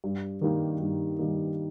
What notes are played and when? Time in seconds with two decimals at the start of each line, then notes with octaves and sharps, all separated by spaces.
0.04 G2
0.41 D#3 G3 A#3 D#4
0.80 G2
1.19 D#3 G3 A#3 D#4